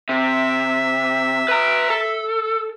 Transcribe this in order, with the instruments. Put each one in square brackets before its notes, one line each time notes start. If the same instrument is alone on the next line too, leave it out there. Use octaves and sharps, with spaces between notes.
[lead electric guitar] C3 [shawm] E5
[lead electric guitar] B4 A#5
A4